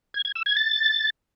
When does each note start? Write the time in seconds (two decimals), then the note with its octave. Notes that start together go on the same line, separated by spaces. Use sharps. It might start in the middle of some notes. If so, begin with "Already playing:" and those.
0.14 G#6
0.25 G#6
0.35 E6
0.46 G#6
0.57 A6